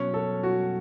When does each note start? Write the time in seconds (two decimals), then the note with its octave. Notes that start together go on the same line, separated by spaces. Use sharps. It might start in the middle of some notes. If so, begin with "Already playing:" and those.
Already playing: B2 F#3 C#4 C#5
0.14 A4
0.43 F#4